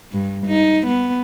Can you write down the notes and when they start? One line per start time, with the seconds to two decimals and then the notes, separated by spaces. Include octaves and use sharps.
0.12 G2
0.46 D#4
0.87 B3